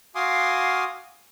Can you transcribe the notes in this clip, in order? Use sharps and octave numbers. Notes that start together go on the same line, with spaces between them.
F#4 F5 G#5 C6 D6 D#6